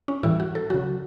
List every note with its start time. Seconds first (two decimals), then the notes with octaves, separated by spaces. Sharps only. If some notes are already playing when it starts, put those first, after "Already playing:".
0.08 C#4
0.23 A2 E3 G3 E4
0.40 F#4
0.55 A4
0.70 C#3 F#3 F#4